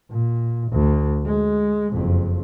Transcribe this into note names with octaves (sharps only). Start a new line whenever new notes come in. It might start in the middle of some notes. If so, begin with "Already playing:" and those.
A#2
D2
G#3
F#1 F2